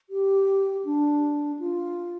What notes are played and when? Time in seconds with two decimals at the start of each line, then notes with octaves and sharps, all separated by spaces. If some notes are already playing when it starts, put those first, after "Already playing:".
0.10 G4
0.85 D4
1.59 F4